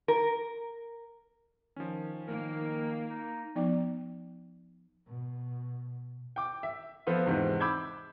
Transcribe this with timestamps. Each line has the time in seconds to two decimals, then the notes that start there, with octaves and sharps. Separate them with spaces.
0.08 A#4
1.76 D#3 F3 C#4
2.27 D#3 A#3 A#4
3.07 D#4
3.56 F3 B3 D#4 D5 G5 D6
5.08 B2
6.36 G5 D6
6.63 E5
7.07 F3 B3 C4 F4 A4 B4
7.26 E2 G#2 C3
7.60 B5 D6 E6 G6 G#6